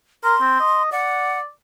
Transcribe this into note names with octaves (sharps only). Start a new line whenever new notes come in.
A#4 C6
C4
D#5
D5 F#5